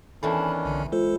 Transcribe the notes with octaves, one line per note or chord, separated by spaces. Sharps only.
E2 D#3 E3 C#4 D4 A4 A5 B5
B1 D3
G#3 F4 A4 C5